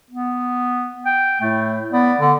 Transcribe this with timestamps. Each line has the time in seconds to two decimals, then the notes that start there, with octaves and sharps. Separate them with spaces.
0.11 B3
1.06 G5
1.41 A2 A3
1.92 B3 D5
2.20 D3